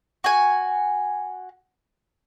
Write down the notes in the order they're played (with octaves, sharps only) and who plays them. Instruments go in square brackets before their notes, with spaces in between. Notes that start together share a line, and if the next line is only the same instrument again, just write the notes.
[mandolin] F#4 G#5